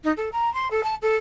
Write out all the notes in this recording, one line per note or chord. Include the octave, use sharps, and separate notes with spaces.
D#4
A4
A#5
C6
A4
A5
A4